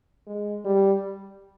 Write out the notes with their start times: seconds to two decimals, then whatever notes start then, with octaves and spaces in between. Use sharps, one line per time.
0.27 G#3
0.65 G3